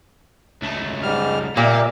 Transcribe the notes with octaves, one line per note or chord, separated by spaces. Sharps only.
C#2 A3
G#2 G3 F6
A#2 A#3 G4 D5 E5 A#5